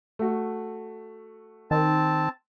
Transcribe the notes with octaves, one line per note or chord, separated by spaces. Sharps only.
A3 F#4
D#3 C4 A5